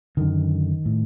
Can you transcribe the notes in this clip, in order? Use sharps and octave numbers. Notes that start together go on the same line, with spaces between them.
F#2 D3 D#3
A2